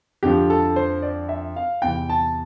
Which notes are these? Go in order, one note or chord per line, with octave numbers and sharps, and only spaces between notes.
F2 D3 F3 G4
A4
C5
D5
E5
F5
E2 C3 E3 G5
A5